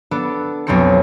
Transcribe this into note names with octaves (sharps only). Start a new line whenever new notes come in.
B3 D4 A4
B1 F2 F#3 C4 A4 C#7